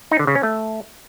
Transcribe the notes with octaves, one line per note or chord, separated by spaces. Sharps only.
D#4
D3
C#3
C#4
A3